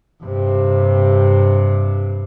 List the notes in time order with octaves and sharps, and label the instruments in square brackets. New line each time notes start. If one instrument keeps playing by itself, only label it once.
[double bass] G2 C3